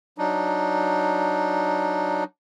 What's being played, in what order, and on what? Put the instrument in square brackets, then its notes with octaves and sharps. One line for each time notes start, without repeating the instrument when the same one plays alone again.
[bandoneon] F#3 D4 D#4